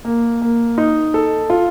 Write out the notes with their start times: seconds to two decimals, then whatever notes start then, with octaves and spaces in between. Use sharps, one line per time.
0.05 A#3
0.42 A#3
0.78 D#4
1.14 A4
1.50 F4